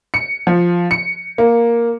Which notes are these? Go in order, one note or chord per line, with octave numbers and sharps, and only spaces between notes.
C#7
F3
C#7
A#3